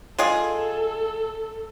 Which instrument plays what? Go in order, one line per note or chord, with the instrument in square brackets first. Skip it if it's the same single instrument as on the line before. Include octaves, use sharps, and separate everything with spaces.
[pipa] G#3 F4 G#4 [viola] A4